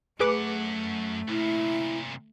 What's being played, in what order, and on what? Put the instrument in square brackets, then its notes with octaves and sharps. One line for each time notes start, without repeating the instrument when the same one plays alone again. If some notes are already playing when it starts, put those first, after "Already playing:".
[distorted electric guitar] F#2 F#5 [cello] A3 [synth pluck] G#4 B4 D6
[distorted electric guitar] C2 A#2 [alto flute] E4